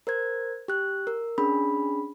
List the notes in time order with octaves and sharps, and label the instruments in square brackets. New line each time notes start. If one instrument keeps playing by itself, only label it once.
[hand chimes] A#4 C5 G#6
G4 F#6
A#4
C#4 D4 G#4 B5